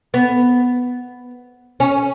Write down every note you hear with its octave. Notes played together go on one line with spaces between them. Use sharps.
B3
C#4